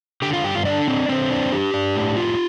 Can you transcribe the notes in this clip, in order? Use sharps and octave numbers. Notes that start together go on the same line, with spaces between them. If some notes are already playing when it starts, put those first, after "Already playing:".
D3 G4 G5
F4 F5
G2 G4 G5
F4 F5
D3 D4 D5
C4
D3 C4 C5
D4
D4 G4
D4
A2
F4